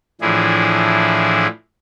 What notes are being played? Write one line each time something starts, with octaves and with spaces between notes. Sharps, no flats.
A2 E3 F3 D4 E4 G#4